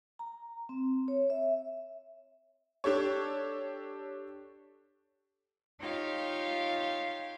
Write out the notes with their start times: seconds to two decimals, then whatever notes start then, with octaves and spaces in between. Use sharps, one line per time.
0.19 A#5
0.69 C4
1.08 C#5
1.30 E5
2.84 D4 G4 A4 C#5
5.79 D#4 F4 G4 C#5 F5 G5